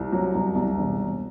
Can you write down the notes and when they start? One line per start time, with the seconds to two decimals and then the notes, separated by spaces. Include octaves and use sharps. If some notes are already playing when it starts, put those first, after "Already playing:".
Already playing: C2
0.12 F#3
0.34 C2
0.55 C2
0.78 E1
0.98 E1